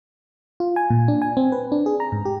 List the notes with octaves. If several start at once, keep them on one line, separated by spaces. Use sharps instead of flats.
F4
G#5
A#2
D4
G#5
C4
B4
D4
G#4
A#5
G#2
G4